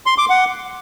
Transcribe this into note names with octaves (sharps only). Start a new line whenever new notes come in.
C6
D6
F#5